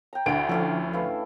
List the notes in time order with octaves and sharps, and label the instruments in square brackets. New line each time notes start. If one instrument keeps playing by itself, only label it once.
[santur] G5 A#5
[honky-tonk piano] D2 D7 [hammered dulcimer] D3 E4
[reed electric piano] F3 [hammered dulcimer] C#4 E4 F5 [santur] A4 D6
[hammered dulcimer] E3 A3 [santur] E4 F5